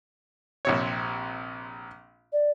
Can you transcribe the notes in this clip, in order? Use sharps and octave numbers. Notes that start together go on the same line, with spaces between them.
A#1 C3 C#5
D5